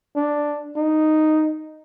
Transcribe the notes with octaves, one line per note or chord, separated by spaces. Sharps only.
D4
D#4